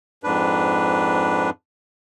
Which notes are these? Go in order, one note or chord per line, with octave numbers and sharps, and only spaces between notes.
F2 G#2 D4 B4